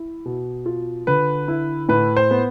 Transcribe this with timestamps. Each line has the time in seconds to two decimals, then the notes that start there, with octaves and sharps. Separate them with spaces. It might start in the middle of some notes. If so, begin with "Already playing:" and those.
Already playing: E4
0.25 B2
0.66 F4
1.07 D3 B4
1.48 E4
1.89 A2 B4
2.17 C5
2.31 B3